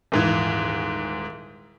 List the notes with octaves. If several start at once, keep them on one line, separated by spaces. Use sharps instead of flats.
D#1 G#2 E3